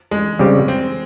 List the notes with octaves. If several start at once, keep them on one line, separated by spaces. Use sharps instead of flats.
G#3
C#3 G3 C4 G4
C4